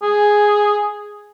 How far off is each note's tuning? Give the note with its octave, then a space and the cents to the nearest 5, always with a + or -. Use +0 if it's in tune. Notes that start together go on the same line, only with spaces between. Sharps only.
G#4 +0